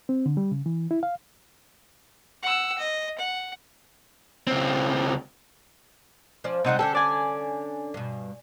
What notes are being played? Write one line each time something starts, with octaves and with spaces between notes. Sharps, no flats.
C4
D3
G3
C#3
E3
E4
F5
F#5 E6
D#5
F#5
C#2 C4
F3 C#4 D5
C3 G3 G#3 C4 D#4 F#5
D3 C#4 D4 A4 G5
D5 G#5
G2 B2